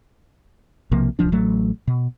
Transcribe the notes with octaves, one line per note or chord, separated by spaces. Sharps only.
B1 C3 F3 A#3
D1 C2 F3 D4
A1 F#3 A3
B2